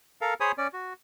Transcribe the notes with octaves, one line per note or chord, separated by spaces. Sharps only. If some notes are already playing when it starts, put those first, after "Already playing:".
A4 A#4 F5
G#4 C5 C#5 G#5 B5 D#6
C#4 D5
F#4